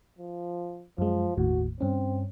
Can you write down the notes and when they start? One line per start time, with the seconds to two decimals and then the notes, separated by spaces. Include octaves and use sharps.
0.18 F3
0.98 F#2 F3 G#3
1.37 G1 D#2 A2 F#4
1.81 G2 C4 C#4